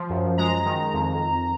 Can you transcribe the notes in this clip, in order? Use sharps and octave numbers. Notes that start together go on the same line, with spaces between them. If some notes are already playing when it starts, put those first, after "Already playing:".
Already playing: F3
F#2
G#3 A#5
D#3
F2